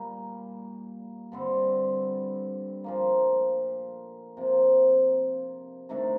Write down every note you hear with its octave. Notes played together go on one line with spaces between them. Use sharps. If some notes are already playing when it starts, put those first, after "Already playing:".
Already playing: A#2 G3 A#3
G2 D3 G3 C4
A#2 F3 A#3
C3 F3 A#3
C3 D#3 A3 D4